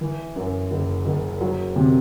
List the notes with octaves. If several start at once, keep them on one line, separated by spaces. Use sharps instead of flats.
E3
F#2
F#1
F#1
F#3
C3